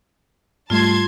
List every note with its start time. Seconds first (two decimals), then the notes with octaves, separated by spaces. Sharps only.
0.70 G#2 G3 A3 F4 A5 C6 G#6